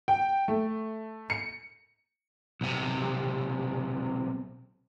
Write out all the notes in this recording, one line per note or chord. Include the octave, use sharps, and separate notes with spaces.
G5
A3
C#7
B1 C3